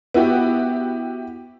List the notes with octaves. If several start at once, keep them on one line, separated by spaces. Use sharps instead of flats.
B3 E4 F#4 G4